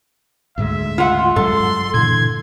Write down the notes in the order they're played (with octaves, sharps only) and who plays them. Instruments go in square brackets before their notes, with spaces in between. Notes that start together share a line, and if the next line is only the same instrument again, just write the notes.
[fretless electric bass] D2 G#2 G#3 [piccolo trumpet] E5
[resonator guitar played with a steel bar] F4 F#5
[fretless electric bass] G2 F#3 G#3 [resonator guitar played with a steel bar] A4 [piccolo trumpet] C6
[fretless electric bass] A#2 D3 E3 [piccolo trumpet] G#6